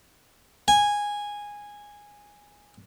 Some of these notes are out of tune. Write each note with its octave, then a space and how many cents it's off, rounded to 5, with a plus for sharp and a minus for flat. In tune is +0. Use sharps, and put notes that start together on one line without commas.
G#5 -10